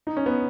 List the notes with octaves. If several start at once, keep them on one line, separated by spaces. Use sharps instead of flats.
D#4
C#4
B3